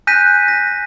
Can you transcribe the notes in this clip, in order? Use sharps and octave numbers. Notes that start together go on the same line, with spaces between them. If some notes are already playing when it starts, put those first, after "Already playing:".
G#5 F#6 G6 A#6 B6 D#7
A#6